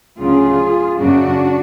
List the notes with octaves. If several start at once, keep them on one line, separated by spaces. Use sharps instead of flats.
D2 C#3 F#3 F4 G#4
F#2 C#3 F#3 D4 F#4